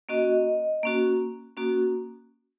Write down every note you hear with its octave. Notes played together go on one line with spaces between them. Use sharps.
A#3 C#4 F#4 D#5
A#3 C#4 F#4
A#3 C#4 F#4